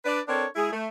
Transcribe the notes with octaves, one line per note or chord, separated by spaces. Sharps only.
D4 B4 D5
C4 D4 A4 A#4 C#5
G#3 E4 G#4
A3